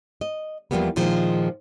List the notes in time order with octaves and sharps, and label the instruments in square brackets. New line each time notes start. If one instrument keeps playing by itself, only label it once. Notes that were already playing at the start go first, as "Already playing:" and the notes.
[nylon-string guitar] D#5
E2 D3 F3 G3 A#3 B3
A#2 D#3 F3 G#3